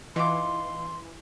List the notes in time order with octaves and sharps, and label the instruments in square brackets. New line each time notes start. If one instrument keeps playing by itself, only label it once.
[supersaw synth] E3 [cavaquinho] D#4 F4 D6 [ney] C6